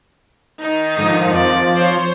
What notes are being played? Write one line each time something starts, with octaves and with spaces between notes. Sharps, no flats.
D#3 D#4
G#2 D3 F3 D#6
F2 D5
C5 C#5